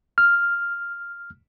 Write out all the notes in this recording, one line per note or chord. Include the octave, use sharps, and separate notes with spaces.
F6